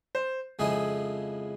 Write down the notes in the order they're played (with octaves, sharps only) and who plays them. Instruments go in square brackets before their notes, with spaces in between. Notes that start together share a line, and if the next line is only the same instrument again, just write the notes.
[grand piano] C5
[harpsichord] F2 C#3 F3 G#3 E4 [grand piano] G#4